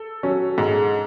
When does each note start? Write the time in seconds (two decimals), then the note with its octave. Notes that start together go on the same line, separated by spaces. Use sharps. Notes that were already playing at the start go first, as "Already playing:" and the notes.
Already playing: A4
0.23 F#3 C#4
0.58 G#2